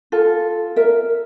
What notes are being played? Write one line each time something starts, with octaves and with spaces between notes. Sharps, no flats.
F4 A4
A#4 E5